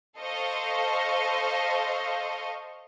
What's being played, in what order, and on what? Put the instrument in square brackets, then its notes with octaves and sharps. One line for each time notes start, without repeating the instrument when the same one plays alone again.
[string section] A4 C5 D#5 F5 C#6